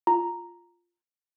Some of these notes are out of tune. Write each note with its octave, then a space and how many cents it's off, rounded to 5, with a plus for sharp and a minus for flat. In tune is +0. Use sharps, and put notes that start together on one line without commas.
F4 +0 A#5 +0